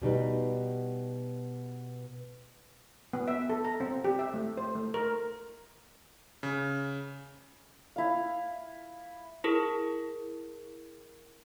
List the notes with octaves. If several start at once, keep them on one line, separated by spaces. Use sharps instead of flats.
B2 G3 D#4 B4
B3
E5
A4
A#5
C4
G4
E5
A3
C5
A3
A#4
C#3
E4 F5
E4 G#4 A#4